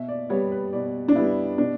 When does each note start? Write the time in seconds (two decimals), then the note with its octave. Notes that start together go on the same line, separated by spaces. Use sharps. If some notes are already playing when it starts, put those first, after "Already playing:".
Already playing: B2 E5
0.09 D5
0.29 G3 B3 C#5
0.52 B4
0.73 B2 D5
1.08 D4
1.15 G3 B3 E4
1.58 B2 D4